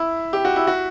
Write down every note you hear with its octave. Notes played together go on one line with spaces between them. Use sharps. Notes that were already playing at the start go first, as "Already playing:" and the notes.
Already playing: E4
G4
F#4
E4
F#4